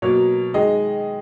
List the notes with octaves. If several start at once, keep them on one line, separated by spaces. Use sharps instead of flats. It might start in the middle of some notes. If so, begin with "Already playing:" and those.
B2 F#3 A#3 C#5
D#3 G#3 D#5